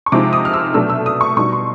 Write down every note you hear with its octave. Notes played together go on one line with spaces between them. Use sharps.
C#6
C3 F3 G#3 C4 D#4 D6
D#6
F6
E6
B2 F#3 A3 D4 E6
E6
D#6
C#6
B2 G3 B3 D#4 C#6
C6